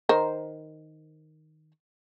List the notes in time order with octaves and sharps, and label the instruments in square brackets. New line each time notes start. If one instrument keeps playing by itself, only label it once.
[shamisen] D#3 A#4 C5